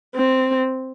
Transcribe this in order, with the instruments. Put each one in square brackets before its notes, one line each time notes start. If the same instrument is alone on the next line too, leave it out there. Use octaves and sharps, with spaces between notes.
[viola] C4